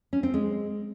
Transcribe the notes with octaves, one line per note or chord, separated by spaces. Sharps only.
C#4
C4
G#3